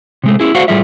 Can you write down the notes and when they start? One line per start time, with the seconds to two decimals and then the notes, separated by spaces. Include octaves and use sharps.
0.24 C3 G#3 A3
0.40 C#4 E4 G#4
0.55 A3 F#4 C5 D5 F5 F#5
0.68 A2 G3 A3 F4 G#4 E5